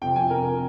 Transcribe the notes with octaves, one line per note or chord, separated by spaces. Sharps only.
F2 C3 F3 G5
G#5
A#4